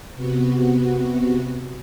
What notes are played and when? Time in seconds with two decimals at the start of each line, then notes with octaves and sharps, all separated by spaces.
0.15 C3 B3 F#4